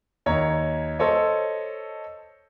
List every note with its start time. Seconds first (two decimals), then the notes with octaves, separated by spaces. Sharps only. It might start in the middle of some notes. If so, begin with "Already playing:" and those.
0.26 D#2 C#5 A#5
0.99 A4 C5 C#5 D#5